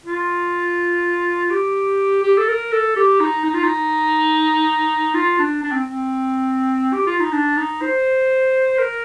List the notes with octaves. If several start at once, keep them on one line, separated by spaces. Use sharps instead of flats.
F4
G4
G4
A4
A#4
A4
G4
D#4
D#4
F4
D#4
F4
D4
D4
C4
C4
G4
F4
D#4
D4
D#4
C5
A#4